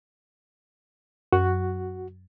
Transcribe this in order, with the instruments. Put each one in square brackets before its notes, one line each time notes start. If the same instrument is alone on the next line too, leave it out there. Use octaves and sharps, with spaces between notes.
[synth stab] F#2 [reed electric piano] F#4